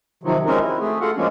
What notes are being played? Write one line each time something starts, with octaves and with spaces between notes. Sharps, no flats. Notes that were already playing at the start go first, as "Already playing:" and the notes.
C3 D#3 F3 F#3
G#3 C4 C#4 D#4 F#4 A#4
E4
A3 G#4
F4 F#4 A4 F5 F#5
F3 G#3 A#3 C#4 D4